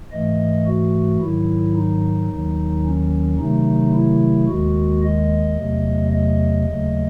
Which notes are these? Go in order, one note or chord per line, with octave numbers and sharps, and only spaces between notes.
G#2 E3 A3 D#5
F#4
G#2 D#3 F#3 E4
D#4
D#2 D#3 F#3
C#4
C3 D#3 F#3 A3 D#4
E4
D#2 D#3 G#3 F#4
D#5
E2 C3 F#3 A3
D#5
D#2 C#3 F#3 A3